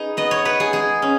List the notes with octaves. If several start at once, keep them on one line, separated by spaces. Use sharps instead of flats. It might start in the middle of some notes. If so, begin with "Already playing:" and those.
Already playing: D#4 G#4 B4
B3 D#5
C#5
D#4 B4
G#4
G#3 G#4
C#4